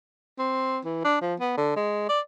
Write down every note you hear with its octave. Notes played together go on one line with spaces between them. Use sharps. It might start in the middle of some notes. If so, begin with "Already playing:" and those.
C4
E3
D4
F3
B3
D3
G#3
D5